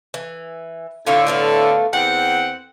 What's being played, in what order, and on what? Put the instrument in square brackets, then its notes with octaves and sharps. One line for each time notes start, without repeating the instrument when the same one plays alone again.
[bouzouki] E3
[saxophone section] A2 D3 [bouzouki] F4 C#5 E5
[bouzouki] A3 B3 F5
[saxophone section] E2 C4 F#5 [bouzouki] G5